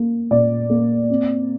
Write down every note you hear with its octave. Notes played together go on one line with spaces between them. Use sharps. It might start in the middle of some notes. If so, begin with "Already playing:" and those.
Already playing: A#3
A#2 D5
A#3
C4